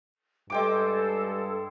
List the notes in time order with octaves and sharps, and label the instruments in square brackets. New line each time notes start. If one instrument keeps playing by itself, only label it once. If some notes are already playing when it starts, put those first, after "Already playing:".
[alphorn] G2 [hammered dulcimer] G#3 G5 D6 [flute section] A4